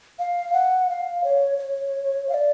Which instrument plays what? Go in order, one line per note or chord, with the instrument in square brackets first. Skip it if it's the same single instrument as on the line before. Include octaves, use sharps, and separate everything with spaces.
[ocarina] F5
F#5
F5
C#5
C#5
F5
D5